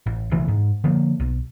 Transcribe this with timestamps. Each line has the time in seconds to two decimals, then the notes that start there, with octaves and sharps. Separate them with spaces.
0.06 A1
0.31 B1 C#3 E3 A3
0.48 G#2
0.84 D3 F3 A#3
1.20 B1